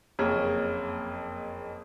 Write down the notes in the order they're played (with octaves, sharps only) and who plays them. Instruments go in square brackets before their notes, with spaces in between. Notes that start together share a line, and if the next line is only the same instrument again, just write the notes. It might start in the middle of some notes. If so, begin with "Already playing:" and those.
[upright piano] F#1 F2 A#3 G#4 C#5